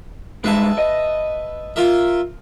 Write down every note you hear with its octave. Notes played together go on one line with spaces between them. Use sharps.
G2 G#3 B4 E5 A5
D#5
F4 A#4 E5